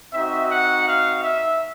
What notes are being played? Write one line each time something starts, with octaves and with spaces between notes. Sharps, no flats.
C4 D#4 F#4 E5
F#5
F5
E5